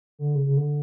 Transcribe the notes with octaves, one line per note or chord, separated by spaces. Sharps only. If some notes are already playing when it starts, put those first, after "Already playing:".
D3
C#3
C#3
D3